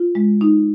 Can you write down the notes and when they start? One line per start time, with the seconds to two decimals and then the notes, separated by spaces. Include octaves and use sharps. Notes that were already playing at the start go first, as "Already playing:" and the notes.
Already playing: F4
0.15 G#3
0.41 D#4